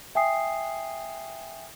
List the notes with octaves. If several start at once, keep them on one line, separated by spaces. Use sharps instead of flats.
E5 G5 G#5 D#6 C7